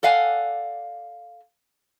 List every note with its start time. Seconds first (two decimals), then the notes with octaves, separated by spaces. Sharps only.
0.03 A4 D5 F5 F#5 G#5